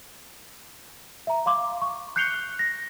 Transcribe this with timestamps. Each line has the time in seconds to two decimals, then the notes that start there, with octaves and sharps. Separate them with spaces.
1.27 E5 A#5
1.46 F5 C6 D6
1.82 C#6
2.16 F#6 G6 C7 C#7 F7 G7
2.34 F#6
2.59 A#6